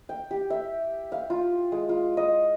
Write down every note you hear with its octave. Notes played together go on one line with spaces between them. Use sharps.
G5
G4
E5
F5
F4
G#3
F4
D#5